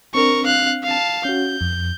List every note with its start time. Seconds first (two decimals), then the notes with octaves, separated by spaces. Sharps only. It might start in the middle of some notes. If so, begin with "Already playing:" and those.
0.15 C4 D4 A#4 C#6
0.45 F5 F#6
0.83 F5 A5
1.25 C#4 F#4 G6
1.61 F2